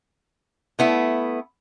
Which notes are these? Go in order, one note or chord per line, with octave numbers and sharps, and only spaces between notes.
A3 B3 E4